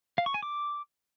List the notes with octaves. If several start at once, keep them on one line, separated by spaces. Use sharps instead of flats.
F5
C#6
G#5
D6